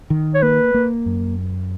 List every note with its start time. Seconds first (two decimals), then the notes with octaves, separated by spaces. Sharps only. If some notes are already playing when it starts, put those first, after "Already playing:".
0.10 D#3
0.35 C#5
0.42 A#3 B4
0.74 A#3
1.06 F#2